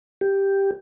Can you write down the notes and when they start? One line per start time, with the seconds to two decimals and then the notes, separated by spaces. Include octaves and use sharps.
0.21 G4